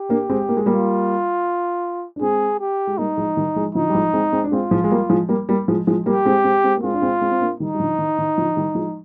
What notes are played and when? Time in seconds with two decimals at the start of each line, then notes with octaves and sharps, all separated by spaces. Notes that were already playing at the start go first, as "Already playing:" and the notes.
Already playing: G4
0.09 A#3 D4
0.30 G#3 C4
0.49 A#3
0.57 G#3
0.66 G3 A#3 F4
2.16 D4
2.21 G#3 C4 G#4
2.60 G4
2.87 G#3
2.98 G3 A#3 D#4
3.17 F3 G#3
3.37 D#3 G3
3.56 F3 G#3
3.75 D3 F3 D#4
3.90 G3
3.95 F3 G#3
4.13 G#3 C4
4.32 G#3 C4
4.44 D4
4.52 G#3 C4 F4
4.71 F3 G#3
4.84 G#3
4.91 G3 A#3
5.09 F3 G#3
5.29 G3 A#3
5.49 G3 A#3
5.68 F3 G#3
5.87 F3 G#3
6.06 G3 A#3 G4
6.25 G#3 C4
6.44 G#3 C4
6.64 G#3 C4
6.77 A#3
6.84 G#3 C4 F4
6.94 D4
7.02 G#3 C4
7.21 G#3 C4
7.31 C4
7.41 A#3 D4
7.60 D#3 G3 D#4
7.74 G3
7.79 D3 F3
7.99 D#3
8.18 D#3
8.37 D3 F3
8.56 D#3 G3
8.75 F3 G#3